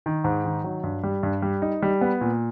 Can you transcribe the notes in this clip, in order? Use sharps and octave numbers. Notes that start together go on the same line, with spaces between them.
D#3
G#2
D#3
F#3
G2
G3
G2
G3
D#4
G3
B3
A#2